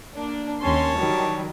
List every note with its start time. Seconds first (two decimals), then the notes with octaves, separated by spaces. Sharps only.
0.15 A#3 D4
0.62 D#2 C#4 C#5 A5 C6
0.98 D#3 F#3 G3